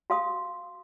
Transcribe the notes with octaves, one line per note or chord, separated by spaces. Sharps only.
F#4 F5 D#6